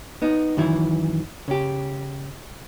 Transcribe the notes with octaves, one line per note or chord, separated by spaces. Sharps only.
B3 D#4
F#2 D#3 E3 E4
C#3 G4